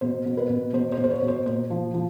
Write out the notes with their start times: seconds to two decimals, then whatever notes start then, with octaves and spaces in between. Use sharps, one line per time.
0.01 B2 C5
0.25 B2
0.37 B4
0.49 B2
0.73 B2 C5
0.92 C5
0.98 B2
1.04 C5
1.10 C#5
1.22 B2
1.28 C5
1.46 A#2 C5
1.70 F3
1.94 F3